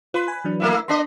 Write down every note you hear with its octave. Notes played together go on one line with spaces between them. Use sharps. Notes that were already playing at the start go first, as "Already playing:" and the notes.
F4 B4 C6
G#5 B5
E3 F#3 D4
A3 A#3 E4
B3 D4 D#5 C6 B6 C7